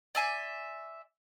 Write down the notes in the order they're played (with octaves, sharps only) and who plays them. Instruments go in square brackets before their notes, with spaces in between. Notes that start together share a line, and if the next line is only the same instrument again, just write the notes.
[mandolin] D5 E5 G#5 C6